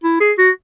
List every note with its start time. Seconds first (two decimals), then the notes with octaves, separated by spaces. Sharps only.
0.04 E4
0.20 G#4
0.38 F#4